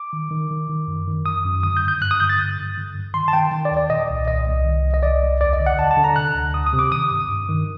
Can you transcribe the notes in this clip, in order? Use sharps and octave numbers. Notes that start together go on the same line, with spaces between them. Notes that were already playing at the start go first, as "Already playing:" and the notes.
Already playing: D6
D#3
D#3
D#3
D#3
F#2
D#3
F#2 D#6
F#2
D3 D#6
G6
G2
G6
G2 F#6
D#6
D3 G6
A6
G2
G2
D3
G2
D#3 C6
A5
D#3 G5
D#3
D5
D#2
D5
A#2 D#5
C2
C2 D#5
C2
D#3
C2
D#5
C2 D5
C2
D#2 D5
D#5
D3
F#5
D3 A5
A5
D3
A#5
C3 F#6
D2
D2 D#6
D#6
C3
D6
D#3 D#6
G2
G2
D#3